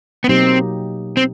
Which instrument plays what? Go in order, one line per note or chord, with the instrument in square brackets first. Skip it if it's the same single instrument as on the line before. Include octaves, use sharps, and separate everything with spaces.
[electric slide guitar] B3
[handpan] B2 F#3 A#3 D#4 G4 [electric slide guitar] C4
[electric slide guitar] C4